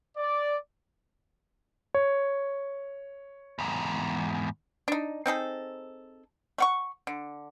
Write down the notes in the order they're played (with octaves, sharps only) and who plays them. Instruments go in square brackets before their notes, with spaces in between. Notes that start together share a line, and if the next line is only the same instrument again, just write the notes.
[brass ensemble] D5
[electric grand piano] C#5
[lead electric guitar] E2 G#2
[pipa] D4 D#4
C4 D#4 G#4 A4
A3 F#5 C#6
D3